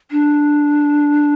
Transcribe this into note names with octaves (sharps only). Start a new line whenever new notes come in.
D4